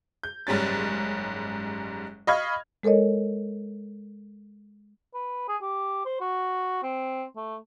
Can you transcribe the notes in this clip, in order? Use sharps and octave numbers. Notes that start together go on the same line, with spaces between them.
G6
F#1 G#2 G3 C#4 A6
D#5 F5 B5 C#6 F6 G#6
G#3 A4 A#4 C#5 D#5
B4
G#4
G4
C5
F#4
C4
A3